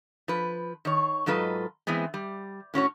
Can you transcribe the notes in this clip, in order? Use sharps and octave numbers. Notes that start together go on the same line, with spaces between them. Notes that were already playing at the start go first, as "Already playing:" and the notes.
F3 B4
D#3 C#5
G#2 F#3 F4 A4 B4 D#5
E3 G#3 B3 C4
G3
A2 C#4 F#4 C#5